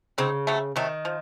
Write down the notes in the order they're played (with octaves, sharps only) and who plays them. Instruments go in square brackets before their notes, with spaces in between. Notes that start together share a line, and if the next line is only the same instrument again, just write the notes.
[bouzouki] C#3 [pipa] F#3 C4 D#4
[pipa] C3 F#3 A3
[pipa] C3 F#3 A3 [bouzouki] D#3
[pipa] F3